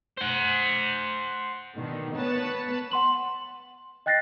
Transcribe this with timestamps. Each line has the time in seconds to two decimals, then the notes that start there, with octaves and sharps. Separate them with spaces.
0.18 C5 F#5
1.77 B2 D3 D#3
2.16 B3 B4 C#5 A5
2.91 F#5 C6 F#7
4.06 D#5 G5 F#6 A6 A#6 C7